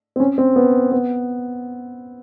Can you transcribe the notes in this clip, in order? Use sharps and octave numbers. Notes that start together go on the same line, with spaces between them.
C4
C#4
C4
B3
B3